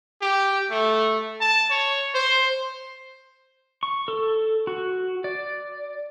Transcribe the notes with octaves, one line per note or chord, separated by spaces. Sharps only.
G4
A3
A5
C#5
C5
C#6
A4
F#4
D5